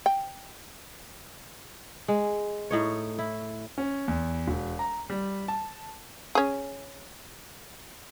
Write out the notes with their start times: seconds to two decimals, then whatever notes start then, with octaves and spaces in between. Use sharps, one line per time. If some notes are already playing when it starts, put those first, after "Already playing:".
0.06 G5
2.08 G#3
2.71 A2 D#4 C#5
3.19 E4
3.78 C#4
4.08 E2
4.48 E1
4.79 A#5
5.10 G3
5.48 A5
6.35 C#4 G#4